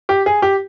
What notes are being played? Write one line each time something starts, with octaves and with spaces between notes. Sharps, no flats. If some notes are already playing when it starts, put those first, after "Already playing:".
G4
G#4
G4